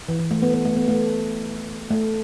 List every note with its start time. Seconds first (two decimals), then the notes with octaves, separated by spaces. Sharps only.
0.09 E3
0.19 E3
0.31 A3
0.42 B3
0.54 B3
0.65 A3
0.77 B3
0.88 A3
1.91 A3